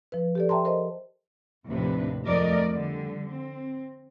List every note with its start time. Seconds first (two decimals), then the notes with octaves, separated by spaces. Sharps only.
0.12 F3 B4
0.35 G4 A4 D5
0.49 E5 G5 A5 A#5 C6
0.65 A#4 C5 D#5
1.69 D#2 A2 C3 F3 D4 B4
2.26 F2 A3 A#4 D5 D#5
2.73 D3 G3
3.27 C4